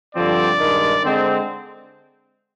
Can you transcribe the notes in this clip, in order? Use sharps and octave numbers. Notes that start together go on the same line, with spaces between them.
G2 D3 F3 C4 D5
G2 D#3 G#3
D3 G#3 C4